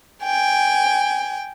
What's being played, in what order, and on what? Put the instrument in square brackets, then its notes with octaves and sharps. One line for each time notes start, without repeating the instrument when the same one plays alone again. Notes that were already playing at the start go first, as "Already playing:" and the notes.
[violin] G5 G#5